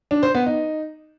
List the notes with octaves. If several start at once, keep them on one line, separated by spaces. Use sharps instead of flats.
D4
C5
B3
D#4